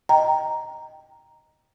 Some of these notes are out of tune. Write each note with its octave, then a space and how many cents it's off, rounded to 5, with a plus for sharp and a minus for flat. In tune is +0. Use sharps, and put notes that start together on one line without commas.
D#5 +0 G5 +0 A#5 +0